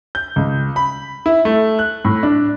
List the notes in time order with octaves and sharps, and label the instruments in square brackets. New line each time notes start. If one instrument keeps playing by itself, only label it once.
[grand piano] G6
C#2
B5
E4
A3
F#6
A2
D4